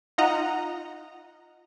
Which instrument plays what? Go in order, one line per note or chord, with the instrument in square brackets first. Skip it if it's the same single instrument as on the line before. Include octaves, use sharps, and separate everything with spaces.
[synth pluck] D#4 F4 D#5 F#5 A#5